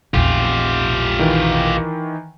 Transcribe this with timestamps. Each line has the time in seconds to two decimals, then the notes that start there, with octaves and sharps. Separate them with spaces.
0.14 A#1 E2 F4 G4
1.19 D#3 E3